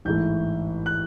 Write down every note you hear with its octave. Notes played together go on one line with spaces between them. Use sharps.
A1 G#2 E3 A3 G6
F#6